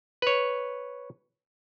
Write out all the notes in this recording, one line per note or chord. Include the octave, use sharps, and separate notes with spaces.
B4 C#5